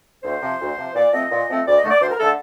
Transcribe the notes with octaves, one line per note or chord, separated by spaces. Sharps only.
D2 C5
C3 F3
D2
C3 F3
A#2 D5
F3 A3 C4 D#5
A#2
F3 A3 C4
D2 D5
D#5
D3 A3
D5
D2 C5
A#4
D3 A3 A4